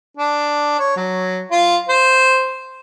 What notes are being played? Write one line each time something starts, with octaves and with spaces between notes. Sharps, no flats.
D4
C#5
F#3
F4
C5